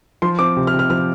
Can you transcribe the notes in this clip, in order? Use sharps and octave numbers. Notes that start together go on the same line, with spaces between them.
F3 C6
C4 D6
C3
F6
C3
F6
F3 F6